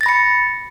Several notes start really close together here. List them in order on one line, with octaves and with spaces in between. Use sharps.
A6 A#6 B5 C#7